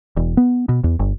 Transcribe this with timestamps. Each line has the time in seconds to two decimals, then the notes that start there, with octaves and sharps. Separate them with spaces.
0.17 E1
0.37 B3
0.69 B2
0.84 E2
0.99 G1